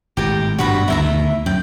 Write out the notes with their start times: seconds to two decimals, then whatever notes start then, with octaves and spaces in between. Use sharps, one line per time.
0.17 G#1 A2 G4 A#5
0.59 G2 B2 G3 F#4 B4 A#5
0.88 D2 B2 D#3 E4 E5 A#5
1.46 F#2 G5